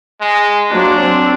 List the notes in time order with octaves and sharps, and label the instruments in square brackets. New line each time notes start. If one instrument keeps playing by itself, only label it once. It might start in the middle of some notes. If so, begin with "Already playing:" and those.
[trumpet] G#3
[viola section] F#3 A#3 C5 [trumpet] D4
[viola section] C4